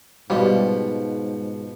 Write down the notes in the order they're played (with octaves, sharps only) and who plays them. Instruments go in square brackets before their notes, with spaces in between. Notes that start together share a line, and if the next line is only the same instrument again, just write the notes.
[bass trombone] G#2 [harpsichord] B2 F3 [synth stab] G3